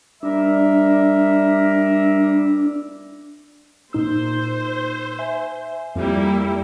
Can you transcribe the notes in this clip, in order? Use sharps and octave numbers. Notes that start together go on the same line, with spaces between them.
G3 D4 A#4 E5
A#2 D#4 C5 E6
E5 G#5
F2 G3 A#3 E4